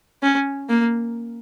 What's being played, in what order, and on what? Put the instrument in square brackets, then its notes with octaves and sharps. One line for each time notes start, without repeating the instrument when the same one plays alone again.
[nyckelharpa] C#4
A#3